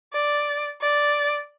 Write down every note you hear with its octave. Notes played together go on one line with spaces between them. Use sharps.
D5
D5